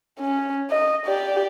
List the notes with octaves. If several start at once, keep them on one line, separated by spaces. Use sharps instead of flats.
C#4
D#5
G4 D5